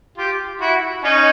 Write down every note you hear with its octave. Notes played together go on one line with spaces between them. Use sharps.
F4 G4
E4 F#4
C#4 D#4